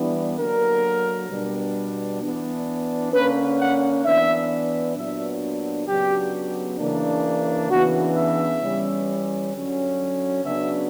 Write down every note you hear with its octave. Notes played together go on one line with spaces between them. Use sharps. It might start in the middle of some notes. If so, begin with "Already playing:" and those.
Already playing: E3 G3 B3 D4
D3 F#3 A#3 A#4
B2 G3 B3 D4
E3 B3 D4
D3 A#3 C#4 B4
F#5
E3 B3 D4 E5
A#2 F#3 B3 D4 E5
C#3 F#3 B3 D4 G4
C#3 E3 A#3 D4
C#3 E3 B3 D4 F#4
E5
E3 G3 C#4
D3 F#3 C#4
C#3 F#3 B3 D4 E5